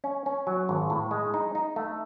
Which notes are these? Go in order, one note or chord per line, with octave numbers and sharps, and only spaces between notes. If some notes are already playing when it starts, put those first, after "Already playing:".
C#4
C#4
F#3
G#1
A2
G#3
D#4
D#4
A3